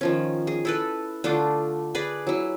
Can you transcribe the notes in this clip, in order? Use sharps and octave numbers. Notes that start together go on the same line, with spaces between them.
D#3 F3 C#4
G#4
E4 A4 B4
D3 A3 D4 F4
G#4 B4 D5 G#5
F#3 E4